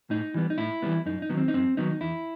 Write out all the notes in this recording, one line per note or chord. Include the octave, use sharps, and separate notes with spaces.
A2 D#4
E3 G3 B3
D#4
A2 E4
E3 G3 B3
F#2 D#4
D#4
D#3 F#3 B3
C4
D#4
F#2 C4
D#3 F#3 B3 D#4
E2 E4